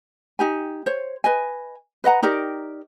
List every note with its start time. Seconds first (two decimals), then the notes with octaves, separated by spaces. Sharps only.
0.39 D#4 G4 G#5
0.86 C5 C#5
1.24 B4 D#5 G#5
2.04 B4 D#5 F#5 A#5
2.23 D#4 G4 A#4 D5